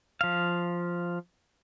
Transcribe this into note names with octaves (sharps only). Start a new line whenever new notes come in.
F3 F5